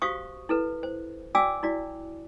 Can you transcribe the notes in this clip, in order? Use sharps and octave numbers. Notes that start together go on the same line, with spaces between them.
F#4 G4 C5 F5 C#6 D#6
E4 A4 B4
C5
F#4 D5 G5 G#5 D6 E6
E4 F#4 D5